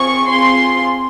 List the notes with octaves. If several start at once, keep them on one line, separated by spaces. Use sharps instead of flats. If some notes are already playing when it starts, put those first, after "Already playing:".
Already playing: C4 F4 G#4 C#6
C4 F4 G#4 C6